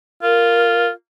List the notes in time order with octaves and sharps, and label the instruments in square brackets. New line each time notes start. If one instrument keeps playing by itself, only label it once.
[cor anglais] F4 [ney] A#4